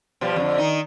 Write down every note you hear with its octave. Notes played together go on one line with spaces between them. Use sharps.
B2 F3 G3
F2 B2 D3
D#3 D#4